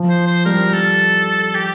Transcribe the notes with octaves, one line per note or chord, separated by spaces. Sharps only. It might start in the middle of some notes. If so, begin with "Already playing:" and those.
Already playing: F3
C5
C5
G3 A#4
A4
G4